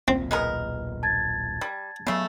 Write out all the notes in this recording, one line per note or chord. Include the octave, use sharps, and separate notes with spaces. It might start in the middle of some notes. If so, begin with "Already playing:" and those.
D#1 B1 A#2 C4
G#3 B3 A#4
A5 G#6 A6
G3
C#3 F#3 A3 B3